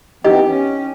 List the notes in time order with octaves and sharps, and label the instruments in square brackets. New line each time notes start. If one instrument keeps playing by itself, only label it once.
[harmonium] E3 B3 C4 [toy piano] D#4 E4 D#5 [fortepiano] G4
[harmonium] C#4